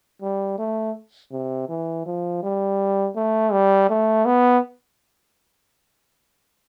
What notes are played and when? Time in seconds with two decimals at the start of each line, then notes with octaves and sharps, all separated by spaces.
0.22 G3
0.58 A3
1.32 C3
1.69 E3
2.06 F3
2.43 G3
3.16 A3
3.52 G3
3.90 A3
4.26 B3